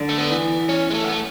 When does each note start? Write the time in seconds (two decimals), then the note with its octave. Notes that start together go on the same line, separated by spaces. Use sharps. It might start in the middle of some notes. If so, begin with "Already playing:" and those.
Already playing: D3
0.09 A3
0.18 B3
0.31 E3
0.69 C#4
0.90 G#3
0.94 A3
1.04 B3
1.11 A3